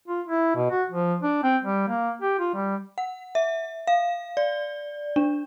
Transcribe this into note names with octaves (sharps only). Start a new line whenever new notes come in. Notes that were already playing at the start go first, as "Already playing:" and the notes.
F4
E4
B2
F#4
F3
D4
C4
G3
A#3
G4
F4
G3
F#5
E5
F5
D5
D4